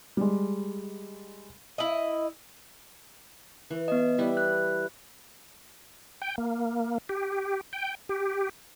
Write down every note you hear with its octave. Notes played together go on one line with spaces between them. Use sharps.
G3 G#3
E4 D#5
E3
B3 D#5
G3 E4 B4
F#6
G5
A#3
G4
G5
G4